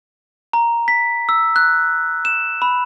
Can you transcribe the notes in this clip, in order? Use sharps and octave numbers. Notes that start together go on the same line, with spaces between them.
A#5
B6
E6
F#6
E7
B5